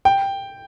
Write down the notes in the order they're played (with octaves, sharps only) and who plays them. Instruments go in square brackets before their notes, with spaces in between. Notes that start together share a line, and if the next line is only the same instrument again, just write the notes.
[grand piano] G5